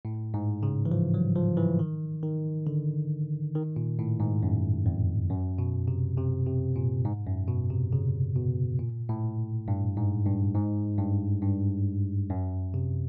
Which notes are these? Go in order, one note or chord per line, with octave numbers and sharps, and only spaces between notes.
A2
G#2
C#3
E3
F3
F#3
F3
E3
D#3
D#3
D3
D#3
A#2
A2
G#2
F#2
F2
F#2
B2
C3
C3
C3
A#2
G#2
F#2
B2
C3
C#3
B2
A#2
A2
G2
G#2
G2
G#2
G2
G2
F#2
C3